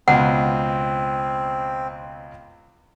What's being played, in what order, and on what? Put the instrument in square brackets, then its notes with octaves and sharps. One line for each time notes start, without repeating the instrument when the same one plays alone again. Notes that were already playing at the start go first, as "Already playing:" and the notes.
[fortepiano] C#2 B2 [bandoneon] C4 [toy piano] F#5